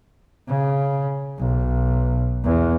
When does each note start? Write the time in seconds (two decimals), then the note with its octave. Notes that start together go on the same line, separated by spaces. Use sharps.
0.47 C#3
1.39 B1
2.44 E2